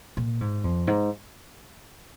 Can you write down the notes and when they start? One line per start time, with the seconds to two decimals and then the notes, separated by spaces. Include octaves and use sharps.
0.17 A#2
0.41 G#2
0.64 F2
0.87 G#2